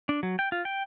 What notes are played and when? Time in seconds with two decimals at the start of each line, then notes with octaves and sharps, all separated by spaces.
0.09 D4
0.23 F#3
0.39 G5
0.52 F4
0.65 G5